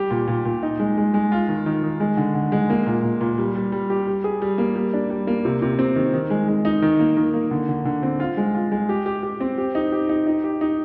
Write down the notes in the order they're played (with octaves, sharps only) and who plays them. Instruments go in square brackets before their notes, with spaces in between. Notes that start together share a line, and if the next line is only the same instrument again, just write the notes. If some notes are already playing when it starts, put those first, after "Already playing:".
Already playing: [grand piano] G3 G4
A#2
A#2
A#2
D#4
G#3
G#3
G#3
F4
D#3
D#3
D#3
G#3
D3
D3
G#3
A#3
A#2
A#2
A#2
G3
G3
G3
G4
G3
G#4
G3
A#3
G3
D4
G3
A#3
C3
C3
C4
D#3
D#3
G#3
G#3
D#4
D#3
A#3
D#3
A#3
D3
D3
D3
C4
F4
G#3
F4
G#3
G4
G4
G4
C4
G4
D#4
G4
D#4
D#4
G4
D#4